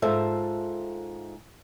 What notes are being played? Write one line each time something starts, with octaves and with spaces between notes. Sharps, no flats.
G#2 F4 A4 C5 E5 A5